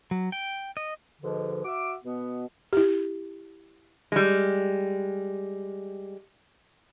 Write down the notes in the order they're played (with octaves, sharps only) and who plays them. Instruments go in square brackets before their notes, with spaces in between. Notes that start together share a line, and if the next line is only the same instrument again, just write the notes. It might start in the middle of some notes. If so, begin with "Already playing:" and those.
[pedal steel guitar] F#3
G5
D#5
[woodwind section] G#2 B2 D3 F3
F#4 E5 D6
B2 B3
[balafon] E4 G4
[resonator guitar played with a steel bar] G3 G#3